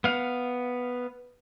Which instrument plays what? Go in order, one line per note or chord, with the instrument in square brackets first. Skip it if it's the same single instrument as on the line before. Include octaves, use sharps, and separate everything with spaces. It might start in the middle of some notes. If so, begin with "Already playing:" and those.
[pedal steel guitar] B3 F5